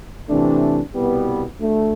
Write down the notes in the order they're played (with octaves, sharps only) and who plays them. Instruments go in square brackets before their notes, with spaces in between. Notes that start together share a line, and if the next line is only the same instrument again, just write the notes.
[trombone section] C3 E3 A3 D4
C2 B2 G3 B3
D2 D3 A3